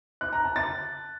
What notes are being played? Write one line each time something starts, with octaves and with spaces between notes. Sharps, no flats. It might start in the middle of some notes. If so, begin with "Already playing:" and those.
F#6
A#5
A5
A6